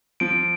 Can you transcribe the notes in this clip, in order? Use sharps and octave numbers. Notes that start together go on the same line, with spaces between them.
F3 D7